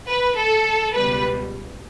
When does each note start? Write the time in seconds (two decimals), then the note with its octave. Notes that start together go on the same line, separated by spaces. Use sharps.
0.10 B4
0.38 A4
0.95 C#2 B2 G3 B4